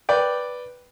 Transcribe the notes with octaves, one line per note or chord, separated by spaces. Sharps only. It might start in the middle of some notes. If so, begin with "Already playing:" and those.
B4 D5 G5